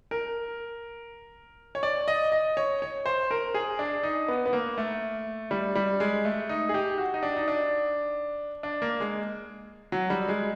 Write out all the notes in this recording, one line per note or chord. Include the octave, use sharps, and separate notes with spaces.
A#4
C#5
D5
D#5
D#5
C#5
C#5
C5
A#4
G#4
D4
D#4
B3
B3
A#3
A3
G3
G3
G#3
A3
D#4
G#4
G4
F#4
D#4
D4
D#4
D4
D4
A#3
G#3
F#3
G3
G#3